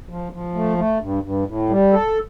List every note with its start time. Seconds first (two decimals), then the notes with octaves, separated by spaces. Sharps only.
0.09 F3
0.32 F3
0.54 A3
0.77 A3
1.01 G2
1.23 G2
1.47 A2
1.69 G3
1.93 A4